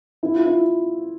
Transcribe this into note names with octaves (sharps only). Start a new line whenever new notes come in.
E4
F4
E4